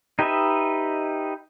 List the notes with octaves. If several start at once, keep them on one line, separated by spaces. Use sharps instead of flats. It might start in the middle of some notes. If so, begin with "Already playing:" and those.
D#4 G4 B4 D#5 E5